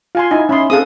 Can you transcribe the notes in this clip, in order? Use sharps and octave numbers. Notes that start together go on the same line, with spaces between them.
F4 F5 G#5 C6
D#4 E4 G#5
C#4 E5 B5 C6 D#6
C4 G#4 A4 F5 D#6